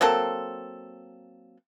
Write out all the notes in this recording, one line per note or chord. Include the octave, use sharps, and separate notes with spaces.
F#3 A#3 C4 A4